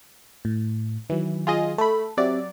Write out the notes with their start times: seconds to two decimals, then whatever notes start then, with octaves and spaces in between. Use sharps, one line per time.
0.45 A2
1.10 D#3 E3 F#3
1.47 F4 G#4 D#5
1.78 A3 A4 B5
2.17 F#3 C4 G4 D5 E5